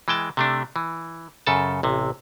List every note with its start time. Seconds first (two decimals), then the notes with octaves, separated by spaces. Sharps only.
0.08 E3 G#3 G5 A5
0.37 C3 A3 D4
0.76 E3
1.47 F#2 C#3 A4 A5
1.83 A1 C3